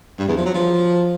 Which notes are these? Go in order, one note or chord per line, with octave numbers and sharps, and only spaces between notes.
G2
E2
F3
F#3
F3